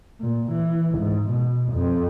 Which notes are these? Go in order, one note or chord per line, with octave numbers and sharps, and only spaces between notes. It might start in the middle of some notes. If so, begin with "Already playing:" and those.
A#2
E3
G#2
B2
F2